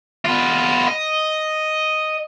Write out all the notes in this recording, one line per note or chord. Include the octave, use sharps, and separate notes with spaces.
B3 F4
D#5